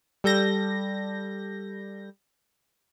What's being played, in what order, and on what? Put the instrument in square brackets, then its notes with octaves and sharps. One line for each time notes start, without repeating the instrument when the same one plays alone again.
[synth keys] G3 A4 G6 A#6